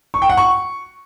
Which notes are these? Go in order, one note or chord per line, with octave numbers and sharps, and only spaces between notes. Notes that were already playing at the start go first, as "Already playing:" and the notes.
C#6
G5
F#5
C#6